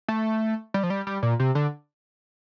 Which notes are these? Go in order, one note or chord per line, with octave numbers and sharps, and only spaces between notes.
A3
G3
F3
G3
G3
A#2
C3
D3